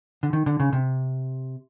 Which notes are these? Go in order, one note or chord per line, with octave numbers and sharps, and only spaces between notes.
D3
D#3
D3
C#3
C3